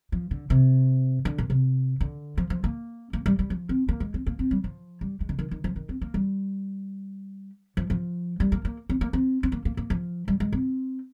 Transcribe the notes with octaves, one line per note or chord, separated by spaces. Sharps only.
F3
D3
C3
D3
A#2
C3
D3
F3
F3
A#3
A#3
G3
G3
F3
C4
A#3
G#3
C4
A#3
C4
G3
F3
G3
G#3
D3
D#3
D#3
F3
D#3
C4
A#3
G3
F3
F3
G3
A#3
A#3
C4
A#3
C4
C4
A#3
A#3
A#3
F3
G3
G#3
C4